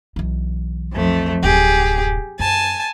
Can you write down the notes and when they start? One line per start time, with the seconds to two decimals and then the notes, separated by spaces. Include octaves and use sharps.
0.16 B1 E3
0.93 F2 A3
1.43 D1 F#2 G4 G#4
2.39 F#2 G#5 A5